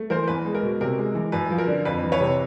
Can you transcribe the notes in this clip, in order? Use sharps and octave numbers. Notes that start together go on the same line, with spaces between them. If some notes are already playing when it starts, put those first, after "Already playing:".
Already playing: A3
E3 A#4 C5
E2 B4
G#3
A#4
B2
C3 A#4
G#3
E3
F#2 B4
F3
A#4
D3
F2 B4
E3
B4 C#5
C3